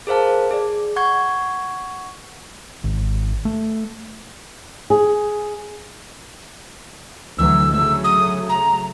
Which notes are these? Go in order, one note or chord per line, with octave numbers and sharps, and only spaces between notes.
G#4 A#4 C5 F5 A5
G#4 D5
F#5 C#6 G#6
G#1
A3
G#4
D2 E3 F#3 E6
C#3 F#3 A3 E6
D#6
A#5